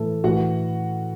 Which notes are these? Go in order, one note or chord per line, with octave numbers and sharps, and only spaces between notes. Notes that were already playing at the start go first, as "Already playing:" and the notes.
Already playing: A2 E3 A4
A2 E3 F#4 F#5